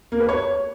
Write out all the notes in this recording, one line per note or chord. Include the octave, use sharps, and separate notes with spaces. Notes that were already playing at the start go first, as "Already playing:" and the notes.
A#3
B4
C#5